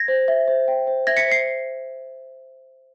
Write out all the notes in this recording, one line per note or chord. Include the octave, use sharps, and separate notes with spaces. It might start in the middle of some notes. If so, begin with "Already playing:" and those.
Already playing: G#6 A#6
C5
E5
C5
G5
C5
E5 G#6 A#6
B6 C#7
C5
C7